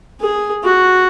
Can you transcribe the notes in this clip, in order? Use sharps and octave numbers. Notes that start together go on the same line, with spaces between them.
G#4
F#4